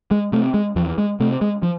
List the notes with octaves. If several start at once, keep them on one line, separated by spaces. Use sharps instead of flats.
G#3
C3 A3
G#3
E2 F3
G#3
C3 A3
G#3
F3